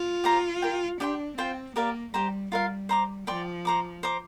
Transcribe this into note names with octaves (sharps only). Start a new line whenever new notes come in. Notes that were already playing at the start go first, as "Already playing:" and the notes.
Already playing: F4
G4 C5 A#5
G4 A#4 G5
D4 G4 D5 G5 C6
C4 F4 C5 G5
A#3 G4 A#4 D5 F5
G3 G4 C5 A#5
G3 F4 A#4 F5
C5 A#5 D6
F3 D5 G5 C6
C5 A#5 D6
C5 A#5 D6